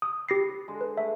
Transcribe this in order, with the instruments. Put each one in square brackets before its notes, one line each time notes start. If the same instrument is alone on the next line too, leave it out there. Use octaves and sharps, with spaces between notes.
[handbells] D#6
[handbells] G4 A#6 C7 [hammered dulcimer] B4
[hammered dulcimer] D3 G#3
[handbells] B4
[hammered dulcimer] A3 [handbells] E5